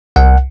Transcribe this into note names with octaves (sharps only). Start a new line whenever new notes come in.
C2 F#5